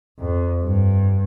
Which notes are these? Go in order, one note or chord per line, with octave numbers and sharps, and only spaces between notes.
F2
G2